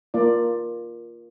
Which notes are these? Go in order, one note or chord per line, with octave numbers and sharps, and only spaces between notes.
A#3 F4 D5